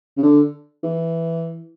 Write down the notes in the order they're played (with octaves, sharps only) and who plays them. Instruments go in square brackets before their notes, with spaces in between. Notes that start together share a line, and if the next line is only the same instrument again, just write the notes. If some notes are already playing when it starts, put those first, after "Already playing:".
[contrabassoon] C#3
D3
E3